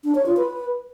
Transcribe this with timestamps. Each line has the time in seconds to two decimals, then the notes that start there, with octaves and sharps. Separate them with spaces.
0.04 D4
0.15 C#5
0.26 F4
0.37 B4